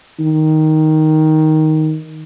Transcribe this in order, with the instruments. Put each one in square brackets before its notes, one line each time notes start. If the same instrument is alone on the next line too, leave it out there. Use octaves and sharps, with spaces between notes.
[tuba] D#3